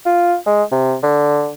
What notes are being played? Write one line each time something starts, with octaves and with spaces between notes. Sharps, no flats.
F4
G#3
C3
D3